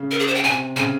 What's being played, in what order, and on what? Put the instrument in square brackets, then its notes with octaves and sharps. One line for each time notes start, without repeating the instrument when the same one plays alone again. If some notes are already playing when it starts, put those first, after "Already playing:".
Already playing: [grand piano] C#3
[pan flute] A#4
G#4
C5
G5
[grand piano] C3 [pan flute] G#5
[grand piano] C#3 [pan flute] G#5